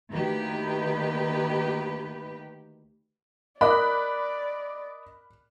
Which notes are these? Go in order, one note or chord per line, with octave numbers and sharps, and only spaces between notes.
D2 D#3 A#3 G4 B4
A#4 D5 D#5 B5 D6 F#6